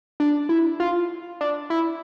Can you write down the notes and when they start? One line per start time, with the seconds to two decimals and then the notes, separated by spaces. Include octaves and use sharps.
0.20 D4
0.49 E4
0.80 F4
1.41 D4
1.70 E4